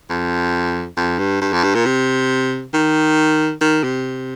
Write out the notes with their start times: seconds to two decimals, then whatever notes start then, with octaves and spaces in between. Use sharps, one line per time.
0.10 F2
0.97 F2
1.19 G2
1.42 G2
1.53 F2
1.64 G2
1.75 A#2
1.86 C3
2.74 D#3
3.61 D#3
3.83 C3